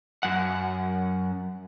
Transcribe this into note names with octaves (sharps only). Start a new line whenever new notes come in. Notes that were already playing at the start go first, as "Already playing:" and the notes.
F#2 F#5